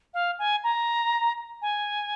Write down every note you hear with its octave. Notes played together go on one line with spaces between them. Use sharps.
F5
G#5
A#5
G#5